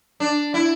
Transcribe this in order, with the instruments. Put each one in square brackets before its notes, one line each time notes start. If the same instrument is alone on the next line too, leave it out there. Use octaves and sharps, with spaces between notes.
[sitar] D4
E4